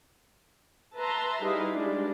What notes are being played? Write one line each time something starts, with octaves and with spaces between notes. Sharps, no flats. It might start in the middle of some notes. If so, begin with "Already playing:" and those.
B4 E5 A5 A#5 C6
G3 D#4 E4 G#4 B4 F5
G3 G#3 D4